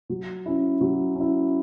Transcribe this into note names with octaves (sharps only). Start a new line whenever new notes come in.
F#3
C#4 E4
F#3
C#4 E4